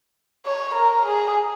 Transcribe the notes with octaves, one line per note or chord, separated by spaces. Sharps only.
C#5
A#4
G#4